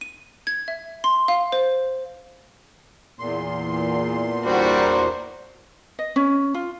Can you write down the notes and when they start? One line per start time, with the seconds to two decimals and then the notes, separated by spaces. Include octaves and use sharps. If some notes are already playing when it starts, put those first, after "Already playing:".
0.01 D#7
0.47 G#6
0.68 E5
1.04 C6
1.28 F5
1.52 C5
3.19 E2 A#2 C6
4.46 G3 D4 F#4 A#4 C5
5.99 D#5
6.16 C#4
6.54 F4